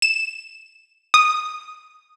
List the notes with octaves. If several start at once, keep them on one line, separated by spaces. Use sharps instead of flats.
E7
D#6